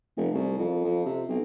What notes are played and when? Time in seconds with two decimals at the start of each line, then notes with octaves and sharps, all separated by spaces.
0.17 F1
0.34 C2
0.58 F2
0.84 F2
1.05 C3
1.29 B1